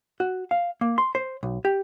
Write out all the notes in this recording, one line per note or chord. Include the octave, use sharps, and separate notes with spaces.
F#4
F5
A#3
C6
C5
B1
G4